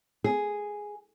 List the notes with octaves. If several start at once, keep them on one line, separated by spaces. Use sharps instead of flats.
G#4